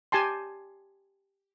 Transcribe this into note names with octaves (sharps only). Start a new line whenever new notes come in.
G4 G#5 A5 C6